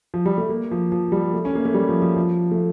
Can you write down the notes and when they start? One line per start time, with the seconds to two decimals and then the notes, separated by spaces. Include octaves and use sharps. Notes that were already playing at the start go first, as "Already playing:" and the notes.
0.14 F3
0.26 G3
0.38 A3
0.49 A#3
0.71 F3
0.92 F3
1.12 G3
1.34 A3
1.45 C#4
1.55 A#3
1.65 A3
1.74 G3
1.89 F3
2.02 F3
2.16 F3
2.51 A3